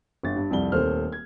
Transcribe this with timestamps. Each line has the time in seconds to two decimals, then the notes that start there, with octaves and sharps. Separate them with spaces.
0.23 G1 A6
0.36 G2
0.50 C2 F2 G3 G7
0.72 D#1 A3 C4 C5 F6
1.12 G#6